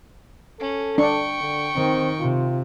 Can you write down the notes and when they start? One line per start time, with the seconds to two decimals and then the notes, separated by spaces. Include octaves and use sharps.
0.60 C#4 A4
0.98 D4 G5 C#6
1.41 D3
1.76 D#3 C4
2.19 C3 F4